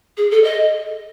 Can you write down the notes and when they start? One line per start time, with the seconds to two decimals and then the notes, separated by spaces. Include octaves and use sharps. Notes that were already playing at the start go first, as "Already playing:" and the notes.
0.17 G#4
0.31 A4
0.44 D#5